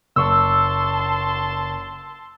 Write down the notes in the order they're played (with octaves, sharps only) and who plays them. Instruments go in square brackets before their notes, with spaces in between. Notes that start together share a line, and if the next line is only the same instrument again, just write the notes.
[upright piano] F#1 C#6 [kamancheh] A5 C6 [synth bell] E6